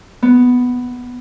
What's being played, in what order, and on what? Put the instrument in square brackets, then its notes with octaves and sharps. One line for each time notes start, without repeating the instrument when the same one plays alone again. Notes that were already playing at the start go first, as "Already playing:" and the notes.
[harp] B3